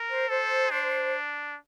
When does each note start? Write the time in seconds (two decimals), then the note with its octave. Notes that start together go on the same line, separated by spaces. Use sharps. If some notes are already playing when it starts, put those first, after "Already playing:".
Already playing: A#4
0.09 C5
0.29 A4 C5
0.71 D4